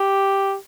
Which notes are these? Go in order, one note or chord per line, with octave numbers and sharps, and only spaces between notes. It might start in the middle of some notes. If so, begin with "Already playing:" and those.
Already playing: G4